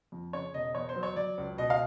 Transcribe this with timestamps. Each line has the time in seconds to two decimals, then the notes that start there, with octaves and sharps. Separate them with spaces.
0.12 F2
0.33 C#3 C#5
0.54 E1 D#5
0.75 E2 C#5
0.89 C5
0.96 F#3
1.03 C#5
1.16 F#3 D5
1.38 C#2
1.58 B2 D#5
1.70 F5